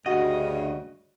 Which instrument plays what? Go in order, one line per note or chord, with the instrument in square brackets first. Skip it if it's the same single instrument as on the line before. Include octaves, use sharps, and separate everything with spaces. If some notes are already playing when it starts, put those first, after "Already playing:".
[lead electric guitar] D2 D#5 [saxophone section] G2 C#3 [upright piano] F#4